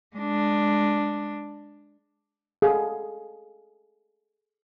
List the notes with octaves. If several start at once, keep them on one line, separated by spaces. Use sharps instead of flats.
G#3 D4
G#4 A4 F5